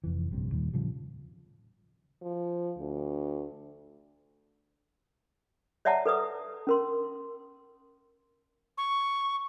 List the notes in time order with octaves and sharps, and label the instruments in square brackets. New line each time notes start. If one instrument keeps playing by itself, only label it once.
[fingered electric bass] F1 F2 E3
A#1 G2 C3
D#2 A#2 D#3 G3
A2 C#3 F3 G3
[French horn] F3
D2
[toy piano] C#5 D5 E5 F#5 A5 A#5
A4 B4 D5 D#6
C#4 A#4 C6
[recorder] C#6